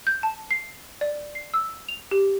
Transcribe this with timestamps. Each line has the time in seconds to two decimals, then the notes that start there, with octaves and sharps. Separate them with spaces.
0.07 G6
0.23 A5
0.51 C7
1.01 D5
1.35 C7
1.54 E6
1.88 F7
2.11 G4